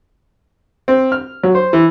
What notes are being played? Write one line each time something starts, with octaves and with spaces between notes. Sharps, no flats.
C4
F6
F#3
C5
E3